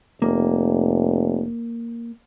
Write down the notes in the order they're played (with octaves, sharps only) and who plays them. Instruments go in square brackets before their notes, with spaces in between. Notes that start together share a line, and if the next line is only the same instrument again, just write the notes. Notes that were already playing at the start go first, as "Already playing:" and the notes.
[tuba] F1 [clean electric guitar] A#3